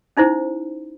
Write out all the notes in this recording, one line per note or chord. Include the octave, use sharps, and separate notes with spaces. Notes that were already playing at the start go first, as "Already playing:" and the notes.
C#4 D#4 E4 C5